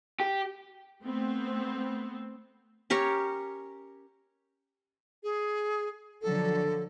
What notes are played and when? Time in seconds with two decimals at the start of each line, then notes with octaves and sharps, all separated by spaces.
0.20 G4
1.04 A3 B3 C4
2.90 C#4 G4 A#4 C#5
5.23 G#4
6.22 D3 F3 F#3 A4